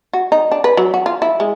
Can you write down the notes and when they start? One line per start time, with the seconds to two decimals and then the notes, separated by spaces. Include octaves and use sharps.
0.13 F#4
0.32 D#4
0.52 D4
0.64 B4
0.77 F#3
0.94 F#4
1.06 F4
1.22 E4
1.40 G#3